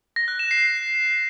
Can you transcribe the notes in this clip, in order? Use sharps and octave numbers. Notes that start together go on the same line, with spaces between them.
A#6
F#6
E7
C7